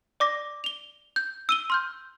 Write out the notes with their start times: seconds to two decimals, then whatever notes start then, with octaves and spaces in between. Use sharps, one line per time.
0.20 D5 D6 A#6
0.64 F7 G7
1.16 G6
1.49 E6 D#7 G7
1.70 C6 F6 G6